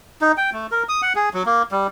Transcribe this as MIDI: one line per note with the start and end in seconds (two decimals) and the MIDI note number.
0.21 0.32 63
0.37 0.50 79
0.53 0.67 57
0.71 0.83 70
0.89 1.01 87
1.02 1.13 78
1.15 1.29 68
1.34 1.43 54
1.46 1.63 58
1.72 1.87 55